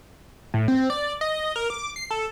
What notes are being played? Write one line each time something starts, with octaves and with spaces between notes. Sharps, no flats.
A2
C4
D5
D#5
A#4
D6
C7
A4